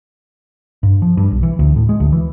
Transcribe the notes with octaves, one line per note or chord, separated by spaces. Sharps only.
G2
F3
G2
B1
E3
D2
A2
G#3
D2
E3